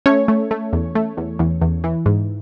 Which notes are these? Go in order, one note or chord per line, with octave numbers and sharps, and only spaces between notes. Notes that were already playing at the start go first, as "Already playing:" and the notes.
A3 C#4 C#5
A3
A3
E2
A3
E2
E2
E2
E3
G#2